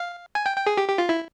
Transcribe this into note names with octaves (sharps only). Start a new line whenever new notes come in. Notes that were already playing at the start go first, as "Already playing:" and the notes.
Already playing: F5
G#5
G5
G5
G#4
G4
G4
F4
E4